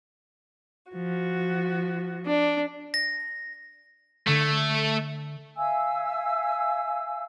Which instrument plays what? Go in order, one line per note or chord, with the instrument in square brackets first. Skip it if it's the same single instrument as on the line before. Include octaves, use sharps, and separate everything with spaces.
[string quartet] F3 F#4
[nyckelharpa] D4
[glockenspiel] A#6
[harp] D3 G#6 [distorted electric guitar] A3
[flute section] E5 F5 G#5 E6